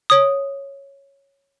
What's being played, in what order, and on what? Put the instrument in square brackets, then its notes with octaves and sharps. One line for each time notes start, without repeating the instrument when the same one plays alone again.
[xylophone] C#5 D#6